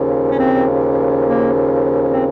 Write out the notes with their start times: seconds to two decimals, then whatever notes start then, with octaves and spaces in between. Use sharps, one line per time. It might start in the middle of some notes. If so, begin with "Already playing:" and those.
Already playing: D#2 C#3 F3
0.31 C#4
0.39 C4
1.25 A#3
2.11 C4